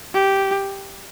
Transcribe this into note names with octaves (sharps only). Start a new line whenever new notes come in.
G4